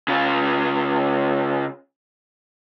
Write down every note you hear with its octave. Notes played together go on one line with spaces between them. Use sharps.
C#3 F4